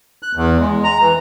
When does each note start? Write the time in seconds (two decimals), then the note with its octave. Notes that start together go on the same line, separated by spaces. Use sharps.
0.23 F#6
0.35 E2
0.60 G#3
0.84 A#5
1.01 E3